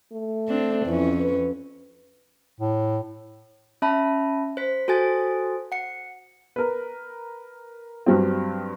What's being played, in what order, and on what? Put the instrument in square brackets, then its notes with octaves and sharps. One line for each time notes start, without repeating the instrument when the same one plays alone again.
[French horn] A3
[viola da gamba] C4 D4
[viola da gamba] F2 C#4 [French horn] E3
[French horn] B4
[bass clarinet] A2
[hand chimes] C#4 E5 A5 B5
C5 B6
F#4 A4 C5 G#5 A6
F#5 C#7
[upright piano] A#4 B4
G2 F#3 G3 C4